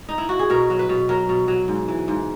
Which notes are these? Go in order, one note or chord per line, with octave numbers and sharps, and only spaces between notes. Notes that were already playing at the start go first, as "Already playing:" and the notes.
D#4
E4
F#4
G#4
B2 A#4
F#3
B4
B2
F#3 A#4
B2
F#3
G#2
E3
G#2